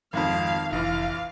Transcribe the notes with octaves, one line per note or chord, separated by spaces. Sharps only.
G#1 F2 D#3 F5
F1 A#1 E3 F5